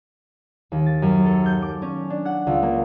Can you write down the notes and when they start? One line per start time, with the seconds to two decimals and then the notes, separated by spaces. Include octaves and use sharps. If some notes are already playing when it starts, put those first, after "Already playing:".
0.72 D#2
0.86 A6
1.02 F#2
1.26 A4
1.46 G6
1.62 D6
1.82 C#4
2.10 D4
2.25 F#5
2.47 C#2
2.62 A#3